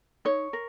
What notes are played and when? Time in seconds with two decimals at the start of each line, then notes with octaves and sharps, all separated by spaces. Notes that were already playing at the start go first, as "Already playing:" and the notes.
0.25 D#4 C#5
0.53 A#4